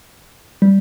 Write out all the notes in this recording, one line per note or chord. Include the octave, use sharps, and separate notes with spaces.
G3